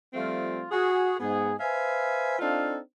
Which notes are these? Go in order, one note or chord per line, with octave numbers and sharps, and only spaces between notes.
F3 G3 A3 C4 F4
F#4 G#4
G#2 B3 G#4
B4 C5 E5 F5 G#5
C4 D4 D#4 F4 A4 F5